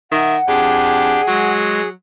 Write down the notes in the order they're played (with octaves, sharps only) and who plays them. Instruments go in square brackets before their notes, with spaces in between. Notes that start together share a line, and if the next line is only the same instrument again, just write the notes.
[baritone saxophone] D#3 [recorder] E5 [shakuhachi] F#5
[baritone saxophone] F2 [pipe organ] D4 G4 [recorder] G#4
[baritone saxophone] F#3 [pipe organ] G#3